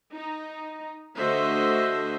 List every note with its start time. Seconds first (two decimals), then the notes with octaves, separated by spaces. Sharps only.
0.14 D#4
1.17 D3 A3 F#4 C5 D#5 E5